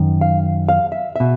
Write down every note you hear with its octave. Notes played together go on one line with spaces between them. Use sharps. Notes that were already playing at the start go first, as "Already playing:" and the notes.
Already playing: F#2 D#3
F5
F5
E5
B2 E5